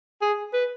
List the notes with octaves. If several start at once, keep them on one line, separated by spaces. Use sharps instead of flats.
G#4
B4